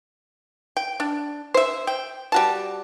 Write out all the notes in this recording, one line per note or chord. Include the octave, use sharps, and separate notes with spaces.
G5
D4
C5 E5
G5
G3 F#4 A5